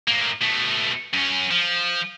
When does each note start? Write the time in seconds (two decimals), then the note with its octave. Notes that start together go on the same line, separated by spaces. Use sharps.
0.08 A2 A#3
0.42 B2 A3
1.13 F#2 C#4
1.51 F3